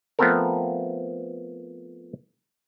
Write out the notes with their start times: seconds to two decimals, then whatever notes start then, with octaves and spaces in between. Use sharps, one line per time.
0.19 F3 A3 B3 C4 A4 A#4